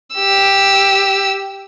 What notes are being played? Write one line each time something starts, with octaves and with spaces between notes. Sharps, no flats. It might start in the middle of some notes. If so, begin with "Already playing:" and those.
G4 E6